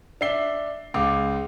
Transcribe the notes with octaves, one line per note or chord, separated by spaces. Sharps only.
D4 E5 C7 G7
C#2 F5 D6